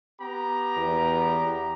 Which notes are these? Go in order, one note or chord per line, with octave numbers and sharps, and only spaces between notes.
B3 G4 A#5
E2